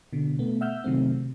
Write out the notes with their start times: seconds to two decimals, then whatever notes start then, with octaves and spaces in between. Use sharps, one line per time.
0.13 B2 D3
0.39 B2 A3 B3
0.61 E5 F#5 E6 F6 G6
0.84 C3 D#3 F#3 A3 C4
1.11 C3